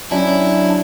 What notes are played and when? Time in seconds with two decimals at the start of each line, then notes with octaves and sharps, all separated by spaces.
0.11 F#3 C#4 D4 E4 D5 G#5